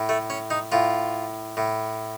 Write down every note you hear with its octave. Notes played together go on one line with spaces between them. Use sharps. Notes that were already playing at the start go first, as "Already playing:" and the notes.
Already playing: A2
A3
C#4
D#4
A2 F4
A2